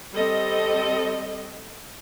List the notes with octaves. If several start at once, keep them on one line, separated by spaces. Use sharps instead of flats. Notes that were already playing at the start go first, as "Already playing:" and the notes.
G3 C4 A4 D#5